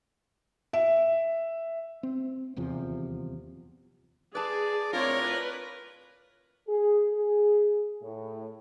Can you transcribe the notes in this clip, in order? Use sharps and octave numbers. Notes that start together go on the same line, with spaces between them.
E5
C4
D#1 E2 C3 F3
G#4 B4 D5 A5
A2 C4 F4 A#4 C#5 D5
B4
G#4
G#4
A2